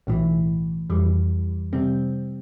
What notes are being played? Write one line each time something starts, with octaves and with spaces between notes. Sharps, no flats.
B1 A2 E3
F2 E3 G3
C3 G3 C4